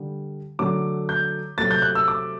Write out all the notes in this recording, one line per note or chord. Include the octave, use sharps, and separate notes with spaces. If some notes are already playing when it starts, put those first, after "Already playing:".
Already playing: D3 G3
D3 F#3 A3 D6
G6
C3 F#3 A3 A6
G6
F#6
E6
D6